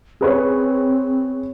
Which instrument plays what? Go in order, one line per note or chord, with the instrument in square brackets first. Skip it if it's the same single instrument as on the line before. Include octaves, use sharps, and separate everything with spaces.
[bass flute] C4 [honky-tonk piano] G#4 B4 C#5